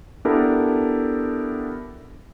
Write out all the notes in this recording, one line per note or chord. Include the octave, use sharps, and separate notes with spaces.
B3 D4 E4 G4 A4 A#4